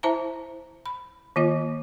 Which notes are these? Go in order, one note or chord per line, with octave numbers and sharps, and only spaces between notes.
E4 C5 E5 A5 A#5
B5
D#3 A#3 F4 D#5